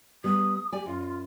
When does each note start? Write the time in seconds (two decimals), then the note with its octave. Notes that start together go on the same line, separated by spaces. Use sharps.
0.24 G3 B3 D#6
0.72 G4 D5 G#5
0.86 F#2 F4